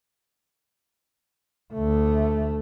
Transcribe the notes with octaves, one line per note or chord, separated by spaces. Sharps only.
D2 A3